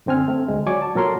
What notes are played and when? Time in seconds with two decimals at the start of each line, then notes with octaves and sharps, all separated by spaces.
0.06 F#2 D3 C4 G#5 F6
0.28 A3 C4
0.48 D2 G#3
0.67 F#3 D5 G#5 C#6 D6
0.82 A5
0.95 A#2 F#3 A4 A#4 C#5 C6